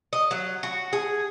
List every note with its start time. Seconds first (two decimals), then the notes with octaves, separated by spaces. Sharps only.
0.13 D#5
0.31 F#3
0.63 F#4
0.93 G#4